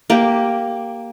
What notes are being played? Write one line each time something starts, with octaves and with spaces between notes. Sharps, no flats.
A#3 G4